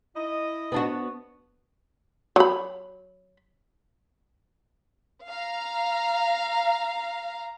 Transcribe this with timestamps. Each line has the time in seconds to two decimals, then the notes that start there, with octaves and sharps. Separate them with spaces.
0.16 E4 D#5
0.72 B3 D4 F#4
2.36 F#3 B5
5.26 F5 A#5